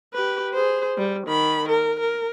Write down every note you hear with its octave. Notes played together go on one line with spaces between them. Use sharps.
G4 B4
G#4 C5
G3
D#3 B5
A#4
A#4